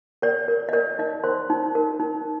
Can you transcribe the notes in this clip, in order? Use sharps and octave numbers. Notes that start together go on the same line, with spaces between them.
A#4 D5
A#4
D#5
A#4 D5
D#4 D#5
A#4 C5 C6
D#4
A#4
D#4